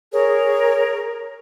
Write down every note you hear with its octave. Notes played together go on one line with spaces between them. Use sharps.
G#4 A#4 C#5